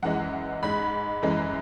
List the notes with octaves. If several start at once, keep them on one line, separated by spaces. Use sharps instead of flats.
F#2 E3 G#3 F#5
G#2 G#3 B5
F#2 E3 G#3